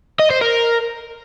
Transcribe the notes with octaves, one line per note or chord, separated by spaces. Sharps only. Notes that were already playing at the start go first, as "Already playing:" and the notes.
D#5
C5
A#4